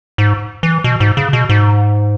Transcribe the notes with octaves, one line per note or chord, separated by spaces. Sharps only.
G#2
E3
B2
G#2
C#3
B2
G#2